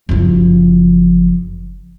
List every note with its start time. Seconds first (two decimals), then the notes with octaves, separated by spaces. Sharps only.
0.09 F#1 F3